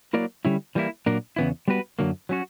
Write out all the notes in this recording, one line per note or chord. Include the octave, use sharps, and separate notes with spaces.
F#3 A#3 E4 A#4 D5
D3 G3 C#4 E4
E3 G3 A#3 E4
A#2 F#3 A#3 D4 A#4
E2 C#3 E3 B3 E4
G3 B3 F#4 B4
F#2 D3 F#3 A#3
F#3 C#4 F#4